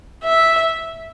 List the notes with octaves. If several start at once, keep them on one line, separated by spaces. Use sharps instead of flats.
E5